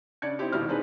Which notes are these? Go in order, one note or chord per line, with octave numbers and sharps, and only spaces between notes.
C#3 D4 D5 G#6 C#7
C4 D#4 E4 G4
D#1 B2 G3 D#4 E4 F6
C4 D4 D#4 G#4 B4